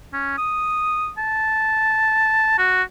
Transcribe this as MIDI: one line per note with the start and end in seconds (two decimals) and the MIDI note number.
0.13 0.35 61
0.38 1.10 87
1.18 2.57 81
2.58 2.82 66